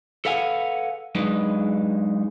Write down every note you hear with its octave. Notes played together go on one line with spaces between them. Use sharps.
A4 B4 F5 F#5 G#5
F#3 G#3 D4 D#4 B4